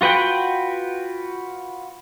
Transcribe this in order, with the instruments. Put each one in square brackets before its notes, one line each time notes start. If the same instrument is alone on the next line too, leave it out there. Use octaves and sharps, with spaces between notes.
[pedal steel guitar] F4 F#4 B4 F#5 G5